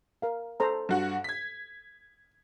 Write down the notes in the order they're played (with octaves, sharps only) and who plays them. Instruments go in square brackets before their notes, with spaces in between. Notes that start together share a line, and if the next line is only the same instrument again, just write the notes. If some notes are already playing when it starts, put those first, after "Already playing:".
[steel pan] A#4 F5
A4 C5 A#5
[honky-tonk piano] G2 F#4 F#5
G#6 B6